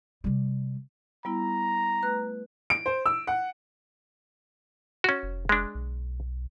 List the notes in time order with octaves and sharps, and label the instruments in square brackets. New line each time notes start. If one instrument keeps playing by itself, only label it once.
[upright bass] C3 G3
[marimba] G3 B3 E4 [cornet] A#5
[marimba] A3 B4 F#6
[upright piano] D7
C5
E6
F#5
[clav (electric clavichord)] C#4 F#4
[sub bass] F1
[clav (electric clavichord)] G#3 D4
[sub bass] B1